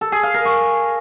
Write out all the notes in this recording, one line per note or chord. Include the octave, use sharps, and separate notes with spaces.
A4
G#4
F5
A#4
C#6